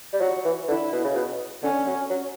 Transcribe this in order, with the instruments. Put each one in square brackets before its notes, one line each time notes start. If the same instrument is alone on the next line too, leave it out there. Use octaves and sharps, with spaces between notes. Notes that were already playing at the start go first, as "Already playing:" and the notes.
[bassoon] G3
[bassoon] F#3 [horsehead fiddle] F#4
[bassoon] E3
[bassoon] D3 [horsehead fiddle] E4
[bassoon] B2
C#3
B2
[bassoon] D3 [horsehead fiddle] C#4
[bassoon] F#3
F#3